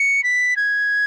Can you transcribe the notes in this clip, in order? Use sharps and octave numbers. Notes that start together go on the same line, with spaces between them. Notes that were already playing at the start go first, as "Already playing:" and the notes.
Already playing: C#7
B6
G#6